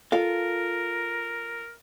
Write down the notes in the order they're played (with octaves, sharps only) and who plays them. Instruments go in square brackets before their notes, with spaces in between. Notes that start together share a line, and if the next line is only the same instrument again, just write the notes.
[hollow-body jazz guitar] F4 A4 F5 [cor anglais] A#4